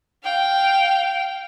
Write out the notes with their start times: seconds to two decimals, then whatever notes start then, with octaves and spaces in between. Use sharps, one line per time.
0.24 F5 G5